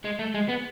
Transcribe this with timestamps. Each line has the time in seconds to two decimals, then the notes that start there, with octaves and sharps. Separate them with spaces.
0.05 G#3
0.19 A3
0.34 G#3
0.48 B3